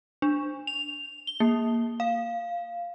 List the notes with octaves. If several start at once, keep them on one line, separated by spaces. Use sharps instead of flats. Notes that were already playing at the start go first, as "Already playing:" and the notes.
D4
F7
G7
A#3
F5